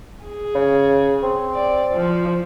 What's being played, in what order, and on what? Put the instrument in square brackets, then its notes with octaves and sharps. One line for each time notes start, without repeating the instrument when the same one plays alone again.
[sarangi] G#4
[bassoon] C#3
C4
[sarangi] D5
F3